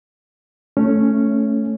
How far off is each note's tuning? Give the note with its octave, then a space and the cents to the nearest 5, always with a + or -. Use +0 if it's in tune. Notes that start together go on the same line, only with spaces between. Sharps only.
A3 +0 C#4 +0